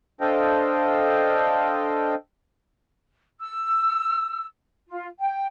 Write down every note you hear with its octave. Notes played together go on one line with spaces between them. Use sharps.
D4 A4 C5 D#5 F5 G5
E6
F4
G5